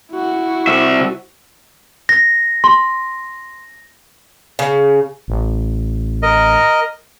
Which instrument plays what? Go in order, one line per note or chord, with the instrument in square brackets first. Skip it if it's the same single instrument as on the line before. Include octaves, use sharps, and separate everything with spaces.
[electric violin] E4 F#4
[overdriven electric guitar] C2 E5
[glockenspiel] A#6
[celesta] C6
[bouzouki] C#3
[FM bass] A1
[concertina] A#4 D#5